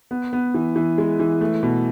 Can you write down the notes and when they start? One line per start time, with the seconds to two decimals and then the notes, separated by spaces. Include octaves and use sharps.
0.11 B3
0.33 B3
0.54 E3
0.76 E3
0.98 G#3
1.19 E3
1.41 A3
1.63 B2